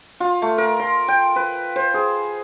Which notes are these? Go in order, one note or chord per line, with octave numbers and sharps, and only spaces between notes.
F4
A3
A#4
C6
G5
B4
C5
G#4